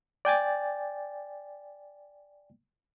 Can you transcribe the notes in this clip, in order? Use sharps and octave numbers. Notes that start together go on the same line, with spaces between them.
D5 G5 G#5 A6